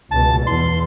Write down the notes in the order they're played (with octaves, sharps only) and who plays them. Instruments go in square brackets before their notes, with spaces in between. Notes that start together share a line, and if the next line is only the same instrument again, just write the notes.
[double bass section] C#2 B2 [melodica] A5
[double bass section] E2 [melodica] C6